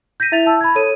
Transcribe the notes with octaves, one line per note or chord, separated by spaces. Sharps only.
G6 A#6 B6 D#7
E4 E5 A6 F7
A5 E6
B5 G#6
A4 C#5 D#7